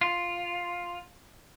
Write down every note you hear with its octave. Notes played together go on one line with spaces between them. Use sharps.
F4